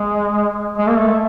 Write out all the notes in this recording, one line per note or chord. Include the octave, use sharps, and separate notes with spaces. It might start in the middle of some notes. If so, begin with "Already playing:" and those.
Already playing: G#3
G#3
A#3
A3